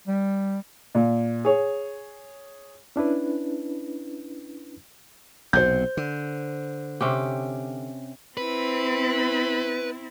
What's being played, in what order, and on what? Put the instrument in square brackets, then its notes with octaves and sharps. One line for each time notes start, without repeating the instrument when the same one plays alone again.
[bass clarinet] G3
[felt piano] A#2
G#4 C#5
[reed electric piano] C#4 D4 E4 B4
[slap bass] B1 C3 [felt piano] C5 G6
[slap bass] D3
[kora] C3 C#4 G4
[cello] C4 E4 [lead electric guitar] B4